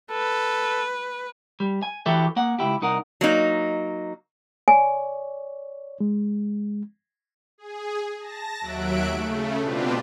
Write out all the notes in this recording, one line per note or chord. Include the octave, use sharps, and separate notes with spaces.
A4 B4
G3
G#5
E3 E4 F#4 G4 A4 E5
A#3 F#5
C#2 F#2 E4 G4
C2 D#4 A#4 F#5
F#3 A#3 D#4
C#5 D5 G#5
G#3
G#4
A5 A#6
D#2 F#3 E5 F#6 D7
C#3 A3
B2 C4 D4 F4 G4 B4